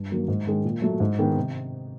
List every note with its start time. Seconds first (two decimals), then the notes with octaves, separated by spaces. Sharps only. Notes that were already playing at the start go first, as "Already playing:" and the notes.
Already playing: G2
0.11 D#3 F#3 A#3
0.28 G#2
0.47 D#3 G#3
0.65 A#2
0.82 F#3 A3
1.00 G#2
1.19 D#3 G#3 B3
1.37 C3